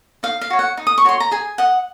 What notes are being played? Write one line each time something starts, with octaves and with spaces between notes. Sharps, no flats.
D#4 F5
F5
F#4 C#5
F#5
D#4
D#6
C#6
F#4 C#5 C6
A#5
G#4 G#5
D#5 F#5